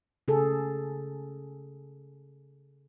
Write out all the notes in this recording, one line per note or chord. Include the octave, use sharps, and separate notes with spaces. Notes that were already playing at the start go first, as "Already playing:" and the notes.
C#3 G#4 A4